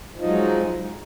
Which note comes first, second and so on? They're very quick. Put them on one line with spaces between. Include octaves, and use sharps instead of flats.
F3 D#4 F#3 G#3